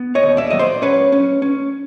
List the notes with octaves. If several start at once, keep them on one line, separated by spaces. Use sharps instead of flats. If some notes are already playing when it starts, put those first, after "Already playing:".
Already playing: B3
C#5 D#5
D#2
D5 E5
F#3 D#5
C5 D5
C#4 B4 C#5
C#4
C#4